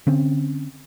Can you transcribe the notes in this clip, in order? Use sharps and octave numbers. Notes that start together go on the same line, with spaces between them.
D3 C4 C#4